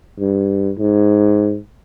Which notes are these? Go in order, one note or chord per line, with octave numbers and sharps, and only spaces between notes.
G2
G#2